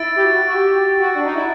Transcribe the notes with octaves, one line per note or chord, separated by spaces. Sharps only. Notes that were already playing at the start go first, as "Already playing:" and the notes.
Already playing: E4 E6 A6 D7
G4
F#4
F#4
G4
F#4
D4
D#4
E4